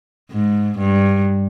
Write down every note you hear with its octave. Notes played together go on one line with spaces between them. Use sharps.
G#2
G2